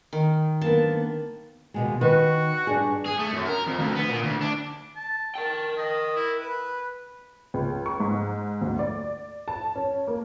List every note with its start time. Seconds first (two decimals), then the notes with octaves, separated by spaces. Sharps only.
0.13 D#3
0.61 D3 A#3 B3 A5
1.74 D#2 B2 G#3
2.01 D#3 F#4 B4
2.67 G2 D4 G#4
3.06 G#4
3.19 A3
3.33 F#2
3.47 A#4
3.67 F2
3.79 D2
3.96 B3
4.10 A#2
4.24 D2
4.42 D4
4.96 A5
5.35 A#4 G5 A5
5.78 D#5
6.16 E4
6.39 B4
7.54 C#2
7.86 C#6
8.00 G#2
8.61 D2
8.79 D5
9.48 A5
9.76 C#4
10.08 A#3